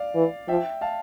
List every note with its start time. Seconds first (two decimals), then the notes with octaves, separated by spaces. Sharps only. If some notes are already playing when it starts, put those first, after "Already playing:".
Already playing: D5 F5
0.15 E3
0.48 F3 E5 G5
0.81 F5 A5